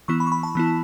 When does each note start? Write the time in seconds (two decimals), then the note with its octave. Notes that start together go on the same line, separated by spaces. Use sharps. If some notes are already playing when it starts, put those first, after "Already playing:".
0.08 E3 B3 E4 C#6
0.20 B5
0.27 C#6
0.32 B5
0.43 A5
0.55 E3 B3 E4